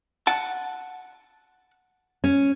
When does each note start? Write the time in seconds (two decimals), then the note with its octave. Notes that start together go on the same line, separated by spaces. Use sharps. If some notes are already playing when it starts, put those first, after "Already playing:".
0.27 F#5 A5
2.24 C#4